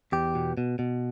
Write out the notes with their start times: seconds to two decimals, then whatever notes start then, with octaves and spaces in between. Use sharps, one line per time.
0.12 E2 G4
0.35 B2
0.57 B2
0.79 B2